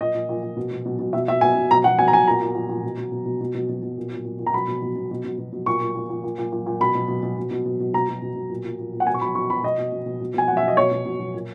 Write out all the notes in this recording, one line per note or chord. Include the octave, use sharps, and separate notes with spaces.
A#2 D#5
A#2
A#2
A#2
B2
B2
B2
B2
B2 E5
B2 E5
B2 G#5
B2
B2 A#5
B2 F#5
B2 G#5
A#5
B2 G#5
A#2 A#5
A#2
A#2
A#2
B2
B2
B2
B2
B2
B2
B2
B2
A#2
A#2
A#2
A#2
A#5
B2 B5
B2
B2
B2
B2
B2
B2
B2
A#2 C#6
A#2
A#2
A#2
A#2
A#2
A#2
A#2
B2 B5
B2
B2
B2
B2
B2
B2
B2
B2 A#5
B2
B2
B2
A#2
A#2
A#2
A#2
F#5
B2 G#5
C#6
B2 B5
B2 C#6
B2 B5
B2 D#5
B2
B2
B2
B2
B2 G#5
B2 F#5
E5
B2
D#5
B2 C#5
B2
B2
B2
A#2